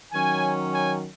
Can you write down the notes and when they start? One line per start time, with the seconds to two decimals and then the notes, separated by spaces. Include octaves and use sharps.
0.13 D#3 F#3 C#4 G#5
0.72 G#5